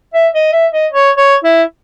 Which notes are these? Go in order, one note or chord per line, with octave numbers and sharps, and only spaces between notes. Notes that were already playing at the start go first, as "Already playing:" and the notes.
E5
D#5
E5
D#5
C#5
C#5
E4